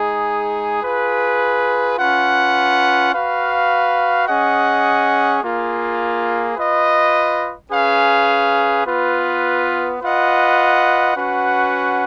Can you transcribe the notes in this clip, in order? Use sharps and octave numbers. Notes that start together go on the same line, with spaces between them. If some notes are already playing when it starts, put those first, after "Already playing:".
Already playing: G#3 D#4 G#4
F4 G#4 B4
C#4 F4 B4 F#5
F#4 B4 F5
C#4 G#4 D#5 F#5
A#3 F4 G#4
F4 B4 D#5
C#4 G#4 B4 F5
B3 F4 B4
F4 B4 D#5 F#5
C#4 F#4 B4 F#5